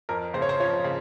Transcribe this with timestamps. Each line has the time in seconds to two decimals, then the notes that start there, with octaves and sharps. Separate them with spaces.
0.09 F2 A#4
0.34 C#3 C5
0.42 C#5
0.49 C5
0.60 F3 C#5
0.84 C#3